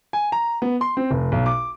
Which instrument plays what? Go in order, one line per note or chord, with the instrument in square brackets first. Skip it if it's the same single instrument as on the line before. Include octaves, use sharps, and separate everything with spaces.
[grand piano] G#5
A#5
B3
C6
C4
F1
B1
D6